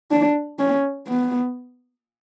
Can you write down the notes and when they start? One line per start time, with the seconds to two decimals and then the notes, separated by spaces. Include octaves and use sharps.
0.11 D4
0.59 C#4
1.07 B3